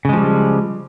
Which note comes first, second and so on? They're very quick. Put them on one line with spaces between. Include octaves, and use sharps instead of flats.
C#3 G#3 F3 G3